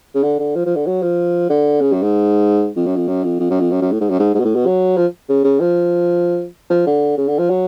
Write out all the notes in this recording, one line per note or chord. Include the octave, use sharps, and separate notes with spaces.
C#3
D3
D3
F3
F3
D3
F#3
F3
D3
C#3
F#2
G#2
F2
F#2
F2
F#2
F2
F2
F#2
F2
F#2
F#2
A2
G#2
F#2
G#2
G#2
B2
A2
B2
F#3
F3
C#3
C#3
F3
F3
D3
C#3
D3
F3
F#3